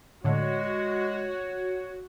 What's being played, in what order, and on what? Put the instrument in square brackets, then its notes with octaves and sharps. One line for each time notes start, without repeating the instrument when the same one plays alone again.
[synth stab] A2 D3 [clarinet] G#3 [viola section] F#4 [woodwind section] C#5